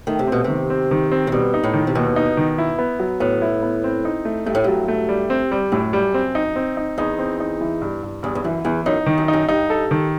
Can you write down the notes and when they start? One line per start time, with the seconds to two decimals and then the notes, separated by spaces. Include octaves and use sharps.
0.07 D#3 A3
0.19 C3
0.27 B2 C4
0.44 C3 D#3
0.70 C4
0.91 D#3
1.12 C4
1.27 C3
1.32 B2 G3
1.54 D#4
1.64 A2
1.74 D#3
1.87 C3
1.95 D#2 B2
2.16 D#4
2.37 D#3
2.58 E4
2.78 B3
3.00 F#3
3.20 A2 B3
3.42 E4
3.63 B3
3.84 C4
4.05 D#4
4.25 A3
4.46 G2 A3
4.55 A2
4.64 G2 F#3
4.88 A3
5.09 G3
5.30 C4
5.52 G3
5.72 F#2 A2
5.93 G3
6.14 C4
6.35 D#4
6.56 C4
6.77 D#4
6.98 E2 D#4
7.18 C4
7.40 D#4
7.61 E3
7.81 G2
8.03 G2
8.23 E2 G2
8.35 E2
8.44 F#2 E3
8.65 E2 E3
8.86 F#2 D#4
9.06 D#3
9.18 F#2
9.28 D#4
9.33 F#2
9.48 G2 D#4
9.70 A4
9.91 D#3